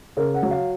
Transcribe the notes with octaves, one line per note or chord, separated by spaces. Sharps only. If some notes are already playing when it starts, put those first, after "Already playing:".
C#3 A#4
F#5
F#3
F5